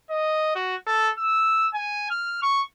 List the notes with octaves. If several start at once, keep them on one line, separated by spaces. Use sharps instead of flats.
D#5
F#4
A4
E6
G#5
F6
C#6